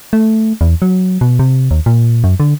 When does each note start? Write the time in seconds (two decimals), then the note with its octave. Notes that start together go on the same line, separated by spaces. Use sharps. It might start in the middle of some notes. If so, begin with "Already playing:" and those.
0.13 A3
0.61 E2
0.82 F#3
1.21 B2
1.39 C3
1.71 D#2
1.86 A#2
2.24 F#2
2.40 D3